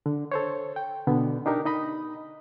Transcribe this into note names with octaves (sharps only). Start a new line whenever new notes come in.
D3
A4 C5 C#5
G5
B2 D3 B3
D4 D#4 G4 A#4
D#4 D#5 B5